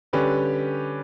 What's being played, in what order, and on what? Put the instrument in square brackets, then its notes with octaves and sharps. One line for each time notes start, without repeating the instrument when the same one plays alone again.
[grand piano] D3 G3 C#4 G4 B4